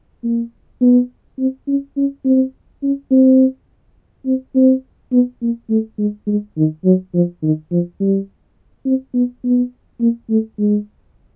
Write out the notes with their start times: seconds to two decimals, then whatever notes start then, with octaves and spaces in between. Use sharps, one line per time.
0.24 A#3
0.82 B3
1.39 C4
1.68 C#4
1.97 C#4
2.25 C4
2.83 C#4
3.11 C4
4.26 C4
4.55 C4
5.13 B3
5.42 A#3
5.70 A3
5.99 G#3
6.27 G#3
6.57 D#3
6.85 F#3
7.14 F3
7.43 D#3
7.71 F3
8.00 G3
8.86 C4
9.15 B3
9.44 B3
10.01 A#3
10.30 A3
10.59 G#3